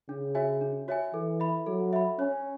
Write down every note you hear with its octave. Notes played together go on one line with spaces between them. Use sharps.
C#3 D4
F#4 C#5 E5 G#5
D4
F#4 C#5 E5 G#5
E3 A4
E5 B5
F#3 A4
E5 B5
C#4 C#5